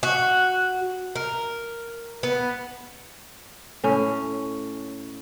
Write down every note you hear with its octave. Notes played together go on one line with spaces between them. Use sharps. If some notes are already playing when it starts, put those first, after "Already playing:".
F#4
A#4
B3
A2 C#4